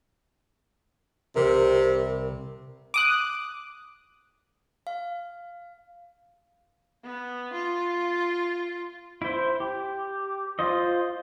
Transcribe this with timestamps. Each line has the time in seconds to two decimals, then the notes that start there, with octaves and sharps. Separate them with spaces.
1.36 C2 C3 A#4
2.94 D6 D#6 F#6
4.87 F5
7.04 B3
7.53 F4
9.22 E4 C5
9.60 G4
10.59 F4 C5 D#5